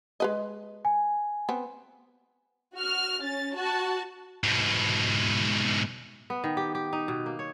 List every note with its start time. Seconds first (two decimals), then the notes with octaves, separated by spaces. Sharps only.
0.20 G#3 B4 D#5
0.85 G#5
1.49 B3 C4
2.75 F#4 F6
3.22 C#4 A6
3.55 F#4 A5
4.43 G#2 B2
6.30 B3
6.44 D#3
6.57 G4
6.75 G4
6.93 D#4
7.08 B2
7.26 A#3
7.39 C#5